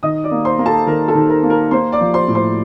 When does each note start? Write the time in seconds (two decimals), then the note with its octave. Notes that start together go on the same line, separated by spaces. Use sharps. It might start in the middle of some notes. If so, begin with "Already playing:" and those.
0.03 D#3 D#5 D#6
0.24 D5 D6
0.31 A#3
0.45 C5 C6
0.59 A#3 A#5
0.66 A4 A5
0.87 D#3 A#4 A#5
1.08 A4 A5
1.15 D#3
1.29 A#4 A#5
1.43 A#3
1.50 A#4 A#5
1.71 A#3 C5 C6
1.92 D5 D6
2.00 F3
2.14 C5 C6
2.28 A2
2.35 C5 C6